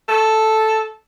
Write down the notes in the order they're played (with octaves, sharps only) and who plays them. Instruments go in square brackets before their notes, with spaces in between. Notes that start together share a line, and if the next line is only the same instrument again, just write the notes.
[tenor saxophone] A4